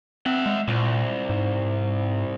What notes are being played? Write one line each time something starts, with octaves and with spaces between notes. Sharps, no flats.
C4 E5 F#5
G#3
C2 A#2
G#2